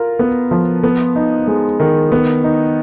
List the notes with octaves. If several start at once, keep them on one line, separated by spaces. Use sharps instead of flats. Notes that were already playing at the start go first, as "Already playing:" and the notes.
Already playing: F4 A#4
B3
F3
B3
D#4
G#3
D#3
B3
D#4